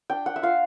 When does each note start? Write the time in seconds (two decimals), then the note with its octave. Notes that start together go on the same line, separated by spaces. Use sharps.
0.10 D4 G5
0.26 F#5
0.36 E5
0.42 F4 F5